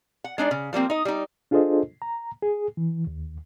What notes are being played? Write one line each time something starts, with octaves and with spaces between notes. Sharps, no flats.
F#5
G#3 D4 D#4 D5
C#3
F3 G3 A#3 C4
D#4 D#5
G3 D#4
D4 F4 G#4 A4 C5 D#5
A#5
G#4
E3
D#2